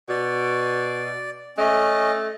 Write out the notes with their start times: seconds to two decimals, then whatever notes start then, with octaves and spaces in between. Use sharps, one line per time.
0.09 B2 D5
1.58 A3 C#4 D#5